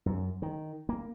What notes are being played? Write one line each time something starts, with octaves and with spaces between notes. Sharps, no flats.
F#2
D#3
A#3